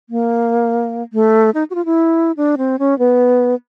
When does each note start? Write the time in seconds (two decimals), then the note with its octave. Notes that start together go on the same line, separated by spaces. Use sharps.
0.10 A#3
1.13 A3
1.54 D#4
1.70 F#4
1.75 F4
1.85 E4
2.37 D4
2.58 C4
2.79 C#4
2.99 B3